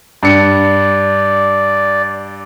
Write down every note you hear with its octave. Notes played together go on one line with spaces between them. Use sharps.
G2 D5 C#7